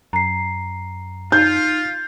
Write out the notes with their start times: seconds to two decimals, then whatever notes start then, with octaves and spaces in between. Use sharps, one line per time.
0.13 F#2 A#5 C7
1.32 D#4 F4 G6